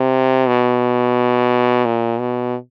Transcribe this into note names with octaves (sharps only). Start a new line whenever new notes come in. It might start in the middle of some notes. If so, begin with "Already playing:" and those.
Already playing: C3
B2
A#2
B2